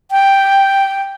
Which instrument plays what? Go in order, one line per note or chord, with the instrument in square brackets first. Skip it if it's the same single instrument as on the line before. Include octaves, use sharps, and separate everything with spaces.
[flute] G5